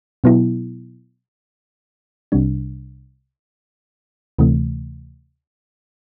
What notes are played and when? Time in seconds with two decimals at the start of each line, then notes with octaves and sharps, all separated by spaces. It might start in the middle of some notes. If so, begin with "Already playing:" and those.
0.24 B2 F#3 B3 E4
2.32 C2 C3 G3 D4
4.39 D2 C3 E3 A3